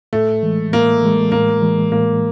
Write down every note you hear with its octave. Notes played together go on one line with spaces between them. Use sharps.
A2 A3
E3 G#3
A2 A#3
E3 G#3
A2 A#3
E3 G#3
A2 A#3